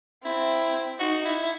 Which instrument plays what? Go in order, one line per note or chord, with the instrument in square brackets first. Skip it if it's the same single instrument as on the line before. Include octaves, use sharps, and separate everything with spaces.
[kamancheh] C4 [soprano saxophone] E4
[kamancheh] D#4 [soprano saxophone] F#4
[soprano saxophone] E4
E4